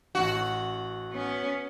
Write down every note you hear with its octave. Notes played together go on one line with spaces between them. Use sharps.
A1 F#4 F#5
B3 C#4